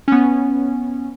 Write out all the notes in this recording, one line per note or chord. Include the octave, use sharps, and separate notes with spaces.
B3 C#4